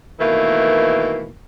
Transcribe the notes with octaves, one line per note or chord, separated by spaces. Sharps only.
B2 D#3 E3 A3 A#3